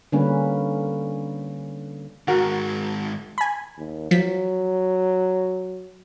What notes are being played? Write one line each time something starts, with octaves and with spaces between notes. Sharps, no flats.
D3 G3 A#3 C#4 B4
G#2 D#3 F#4 A#4 F#5
G#5 B5
D#2
F3 F#3 B6